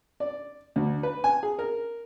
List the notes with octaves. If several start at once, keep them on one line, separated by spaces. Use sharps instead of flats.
D5
D2
B4
G#5
G#4
A#4